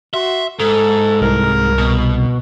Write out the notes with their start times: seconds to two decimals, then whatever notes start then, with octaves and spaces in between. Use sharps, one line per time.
0.14 F#4 E5 C6
0.60 G#2 A4
1.21 C2 A#4
1.78 B2